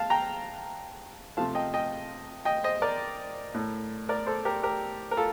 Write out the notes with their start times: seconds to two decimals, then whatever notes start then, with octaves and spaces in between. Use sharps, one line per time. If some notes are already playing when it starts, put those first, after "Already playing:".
Already playing: F5 A5
0.10 G5 A#5
1.37 C3 F3 A3 F5 A5
1.55 D#5 G5
1.74 D#5 G5
2.45 D#5 G5
2.64 C5 D#5
2.82 A#4 D5
3.54 A2 A3
4.09 A#4 D5
4.26 A4 C5
4.45 G4 A#4
4.63 G4 A#4
5.11 A#4
5.17 F4 A4